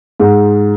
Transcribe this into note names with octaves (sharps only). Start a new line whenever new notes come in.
G#2